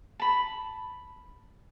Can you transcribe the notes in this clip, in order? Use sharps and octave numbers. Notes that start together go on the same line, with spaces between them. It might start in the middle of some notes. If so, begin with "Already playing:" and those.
A5 B5